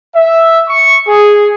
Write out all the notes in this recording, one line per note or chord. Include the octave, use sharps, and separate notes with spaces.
E5
C#6
G#4